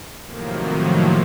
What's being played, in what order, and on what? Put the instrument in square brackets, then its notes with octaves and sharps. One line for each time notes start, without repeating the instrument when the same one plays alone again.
[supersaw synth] A2 C3 D#3 F3 F#3 A#3